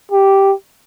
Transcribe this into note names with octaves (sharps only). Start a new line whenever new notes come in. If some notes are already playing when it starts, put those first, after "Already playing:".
G4